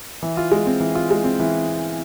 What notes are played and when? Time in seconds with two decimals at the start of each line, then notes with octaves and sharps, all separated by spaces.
0.23 E3
0.37 F4
0.52 G#3
0.66 C4
0.80 E3
0.95 F4
1.11 G#3
1.24 C4
1.40 E3